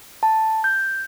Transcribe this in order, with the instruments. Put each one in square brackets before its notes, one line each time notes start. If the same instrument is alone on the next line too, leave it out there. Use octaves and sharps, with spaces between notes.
[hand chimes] A5
G6